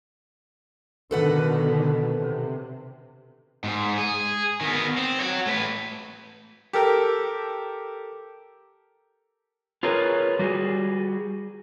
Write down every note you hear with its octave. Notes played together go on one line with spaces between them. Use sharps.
B2 D3 D#3 A4 B4 F#5
C3
G#2
G#4
D#3 B3
C4
C#5 F#5
A3 B4
G4 A4 A#4
F4 G#4 A#4 B4 C#5
G3 F#4 G#4